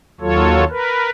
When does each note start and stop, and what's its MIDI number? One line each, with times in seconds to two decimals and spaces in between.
0.21 0.64 39
0.21 0.64 54
0.21 0.64 65
0.21 0.64 69
0.21 0.64 73
0.70 1.10 70
0.70 1.10 71